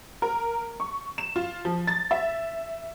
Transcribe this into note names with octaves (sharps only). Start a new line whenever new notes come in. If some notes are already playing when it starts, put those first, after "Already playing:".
A#4
C#6
E7
F4
F3
A6
E5